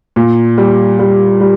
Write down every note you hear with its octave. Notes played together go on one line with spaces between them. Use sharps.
A#2
G3
G3
G3